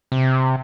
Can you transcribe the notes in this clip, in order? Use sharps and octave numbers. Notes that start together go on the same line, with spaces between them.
C3